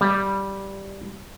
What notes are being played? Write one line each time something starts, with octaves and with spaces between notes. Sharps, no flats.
G3